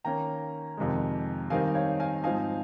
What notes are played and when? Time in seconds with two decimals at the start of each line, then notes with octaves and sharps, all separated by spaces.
0.04 D#3 A#3 C#4 G5 A#5
0.77 F2 C3 D#3 G#3
1.50 G2 D#3 G3 C4 D#4 F5 G#5
1.75 C#5 F5
2.00 F5 G#5
2.24 G#2 F3 C4 D#4 F5 G#5